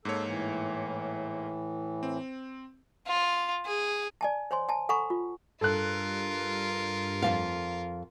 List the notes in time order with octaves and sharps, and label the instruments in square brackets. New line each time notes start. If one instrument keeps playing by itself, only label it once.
[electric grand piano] G#2 A#3 C#5 [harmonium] A4
[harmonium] A2 E3
[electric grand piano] C4
[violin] F4
G#4
[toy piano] D5 G#5 A5
C5 C#5 G#5 C6
G#5 A5
A4 F#5 G#5 A#5 B5 C#6
F4
[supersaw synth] G2 [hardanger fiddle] F4 A#4 [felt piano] A4 F#6
[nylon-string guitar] F2 E3 F5